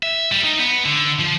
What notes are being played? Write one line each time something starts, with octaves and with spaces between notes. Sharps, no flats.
E5
G3
D#4
B3
D3
F3